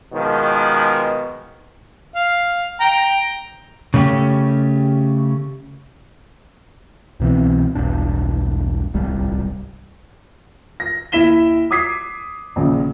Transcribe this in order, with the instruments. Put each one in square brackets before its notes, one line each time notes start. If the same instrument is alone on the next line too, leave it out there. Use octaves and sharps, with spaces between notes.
[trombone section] B2 D#3 F3 G#3
[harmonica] F5
G5 A#5
[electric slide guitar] C#3 A3 C#4 G4
[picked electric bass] C2 B2 E3 C4
E1 B1 G2 D4
D1 G1 C2 G3
[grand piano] A#6
D#2 E4 B6 E7 G7
D6 D#6 G#6 B6 C7
A#1 C#3